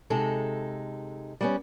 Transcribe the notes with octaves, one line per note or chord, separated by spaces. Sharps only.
C3 G#3 D#4 A4
G3 B3 C#4